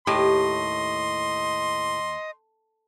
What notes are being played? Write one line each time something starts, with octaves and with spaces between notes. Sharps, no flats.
D#2 A2 G4 D#5 C6